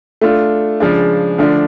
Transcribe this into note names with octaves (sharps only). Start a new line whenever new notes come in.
A3 D4 F4
C#3 F3 G#3 D4
D3 F3 A3 D4